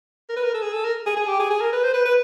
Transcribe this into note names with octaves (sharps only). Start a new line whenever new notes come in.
A#4
B4
A#4
A4
G#4
A4
A#4
G#4
G#4
G4
G#4
G#4
A#4
B4
C5
B4
B4